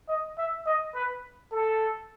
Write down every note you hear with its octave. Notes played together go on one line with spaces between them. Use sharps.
D#5
E5
D#5
B4
A4